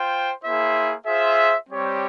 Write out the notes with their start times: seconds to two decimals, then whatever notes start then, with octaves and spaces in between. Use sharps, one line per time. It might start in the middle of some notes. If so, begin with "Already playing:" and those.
Already playing: F4 C5 G5
0.43 A#3 E4 G#4 C5 E5
1.05 F4 G#4 C5 E5
1.68 G3 C4 G4 C#5